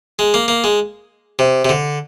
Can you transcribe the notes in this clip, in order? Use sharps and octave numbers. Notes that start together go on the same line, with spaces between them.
G#3
A#3
A#3
G#3
C3
C3
D3